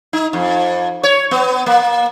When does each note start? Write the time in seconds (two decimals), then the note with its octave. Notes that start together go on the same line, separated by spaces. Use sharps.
0.13 D#4
0.33 F2
1.03 C#5
1.31 B3
1.66 A#3